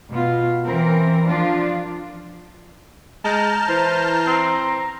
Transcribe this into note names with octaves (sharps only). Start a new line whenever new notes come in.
B2 F4
E3 C4 A#4
F3 D4 F4
G#3 A5 A#5 F6 G6
E3 C5
C4